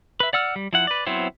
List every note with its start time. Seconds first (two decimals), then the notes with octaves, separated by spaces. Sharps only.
0.20 B4 E5
0.33 D5 F#5 E6 F6
0.56 G3
0.73 F3 E4 F#5
0.87 B4 D5
1.06 F#3 B3 C4 E4 C5